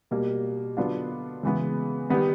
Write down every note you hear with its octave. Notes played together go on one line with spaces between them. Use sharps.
B2 G3 A#3
D3 F#3 B3 D4 F4
C#3 E3 G#3 B3
D#3 G3 B3 D#4